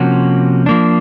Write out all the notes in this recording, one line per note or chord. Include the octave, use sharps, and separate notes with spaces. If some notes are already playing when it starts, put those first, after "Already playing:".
Already playing: C3 F3 A#3 C#4 F#4
F3 A#3 D4